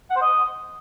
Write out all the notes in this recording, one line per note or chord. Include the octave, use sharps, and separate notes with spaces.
F#5
C5
D#5